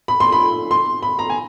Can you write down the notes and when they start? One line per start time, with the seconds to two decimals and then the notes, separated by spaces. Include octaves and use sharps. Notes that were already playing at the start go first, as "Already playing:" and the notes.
0.08 B5
0.20 C6
0.32 B5
0.71 C6
1.03 B5
1.19 A#5
1.30 G#5